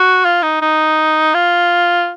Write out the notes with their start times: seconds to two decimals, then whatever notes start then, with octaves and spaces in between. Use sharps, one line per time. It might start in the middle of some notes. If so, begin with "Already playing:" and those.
Already playing: F#4
0.25 F4
0.43 D#4
0.62 D#4
1.34 F4